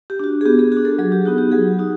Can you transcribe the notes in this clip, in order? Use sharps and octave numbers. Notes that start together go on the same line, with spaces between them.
G4
D4 F#4
G#4
B3 G4
G#4
D4 F#4 G#4
A4
F#3 G#4
G4
B3 D#4 F#4
G4
F#3 G#4
D#4 F#4